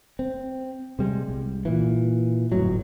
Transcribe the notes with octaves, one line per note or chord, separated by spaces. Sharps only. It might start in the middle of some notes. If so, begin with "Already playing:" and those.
C4
C3 G3 G#3
C2
A#2 E3
G1 F2 A2 F#3